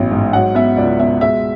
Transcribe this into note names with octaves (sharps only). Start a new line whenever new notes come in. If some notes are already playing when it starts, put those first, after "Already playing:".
Already playing: A1 F#3 B3
G#2
F#3 F#5
B3 E5
C#2 D5
B2 E5
G#3 E5